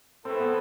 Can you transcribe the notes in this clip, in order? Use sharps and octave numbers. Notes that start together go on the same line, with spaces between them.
A2 E3 A3 C4 E4 A4
B3